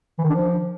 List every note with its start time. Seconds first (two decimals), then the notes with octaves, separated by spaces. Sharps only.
0.19 E3
0.24 D#3
0.30 D4
0.35 F3